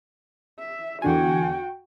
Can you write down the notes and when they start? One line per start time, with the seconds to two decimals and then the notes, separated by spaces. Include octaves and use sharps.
0.59 E5
1.02 E2 D3 F#4 G5 G#5